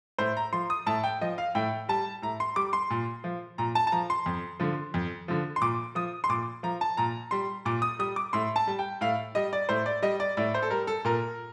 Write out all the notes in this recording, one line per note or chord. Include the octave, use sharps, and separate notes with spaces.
A2 C5
A#5
F3 C6
D#6
A2 A5
G5
F3 D#5
F5
A2 G5
G3 A5
A2 A#5
C6
G3 D6
C6
A#2
F3
A#2 A#5
A5
A5
F3 A#5
C6
F2
D3 F3
F2
D3 F3
C6
A#2 D6
F3 D#6
C6
A#2 D6
F3 A#5
A5
A#2 A#5
G3 C6
A#2 D6
D#6
G3 D#6
D6
A2 C6
A5
G3
G5
A2 F5
G3 D#5
D5
A2 C5
D5
G3 D#5
D5
A2 D5
C5
A4
G3 A#4
A4
A#2 A#4